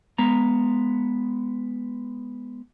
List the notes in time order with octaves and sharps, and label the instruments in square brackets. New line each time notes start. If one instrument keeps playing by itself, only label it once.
[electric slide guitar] G#3 B3 A#5